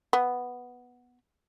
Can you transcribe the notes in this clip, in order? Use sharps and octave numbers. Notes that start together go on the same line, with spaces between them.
B3